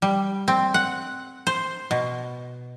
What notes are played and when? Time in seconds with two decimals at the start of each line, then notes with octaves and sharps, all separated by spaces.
0.02 G3
0.48 C4
0.74 F#5
1.47 C5
1.91 B2